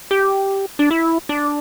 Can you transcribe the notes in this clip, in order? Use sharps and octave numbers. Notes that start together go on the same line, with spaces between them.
G4
D4
E4
D4